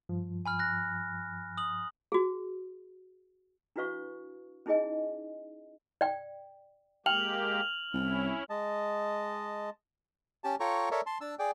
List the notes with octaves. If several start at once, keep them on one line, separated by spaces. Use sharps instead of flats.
G2 F3
G#5 B5 F6
F#6 A#6
D#6 F#7
F#4 G#4
D4 E4 F#4 B4 F5 C#6
C#4 D#4 E4 G#4 D#5 G#5
D5 G5
G#3 A#3 G4 G5 F6 F7 F#7
C2 C#4 E4
G#3 D#5 A5
C#4 G4 A5
F4 A4 C#5 G5 A#5 C#6
A4 A#4 C#5 D5 E5
A5 C6
D4 A5 E6
G#4 D5 G5